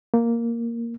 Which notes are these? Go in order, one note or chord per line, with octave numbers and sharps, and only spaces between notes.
A#3